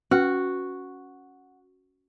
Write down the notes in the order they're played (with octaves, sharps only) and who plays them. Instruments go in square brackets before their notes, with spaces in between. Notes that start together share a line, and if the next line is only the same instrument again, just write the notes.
[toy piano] C#4 B4 [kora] F#4